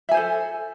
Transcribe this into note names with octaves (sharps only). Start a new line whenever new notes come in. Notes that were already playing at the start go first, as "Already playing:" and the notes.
A4 C5 E5 G#5